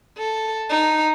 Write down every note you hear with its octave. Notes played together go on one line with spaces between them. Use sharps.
A4
D#4